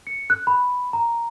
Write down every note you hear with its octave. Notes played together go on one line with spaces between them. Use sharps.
C#7
F#6
B5
A#5